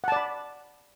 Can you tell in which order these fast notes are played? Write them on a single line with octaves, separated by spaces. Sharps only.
F#5 A5 D5 B5